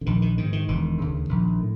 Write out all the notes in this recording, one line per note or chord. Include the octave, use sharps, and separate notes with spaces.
D3
A#1 D#3
D#3
G#2 D#3
D#3
E1 D#3
D2 C#3
A#1
A2